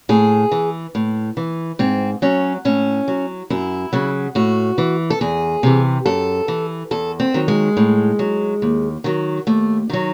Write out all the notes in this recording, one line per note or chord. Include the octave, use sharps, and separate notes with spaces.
A2 G#4
E3
A2
E3
G#2 C4
F#3 C#4
A2 C#4
F#3
F#2 E4
C#3 F#3
A2 F#4
E3
A4
E2 G#4
C3 E3
F#2 A4
E3
E2 A4
C4
D#3 F#3
G#3
A2
F#3
D#2
D#3 F#3
D#2 A3
D#3 F#3 D#4